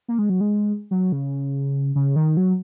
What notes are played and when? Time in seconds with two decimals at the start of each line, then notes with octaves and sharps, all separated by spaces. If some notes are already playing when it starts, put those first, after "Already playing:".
0.08 A#3
0.19 G#3
0.30 F#3
0.41 G#3
0.91 F#3
1.12 C#3
1.95 C#3
2.16 D#3
2.37 F#3